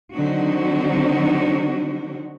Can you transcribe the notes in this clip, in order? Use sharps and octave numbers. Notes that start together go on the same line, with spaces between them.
D3 D#3 F#3 C4 D#4 F#4